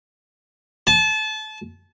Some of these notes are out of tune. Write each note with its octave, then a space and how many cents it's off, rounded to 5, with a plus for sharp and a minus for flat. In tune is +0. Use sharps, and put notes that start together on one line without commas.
A5 -30